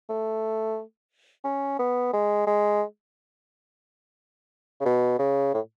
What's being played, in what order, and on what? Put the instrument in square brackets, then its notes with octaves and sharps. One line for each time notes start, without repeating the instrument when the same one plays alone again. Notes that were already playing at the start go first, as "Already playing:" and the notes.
[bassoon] A3
C#4
B3
G#3
G#3
C#3
B2
C#3
A2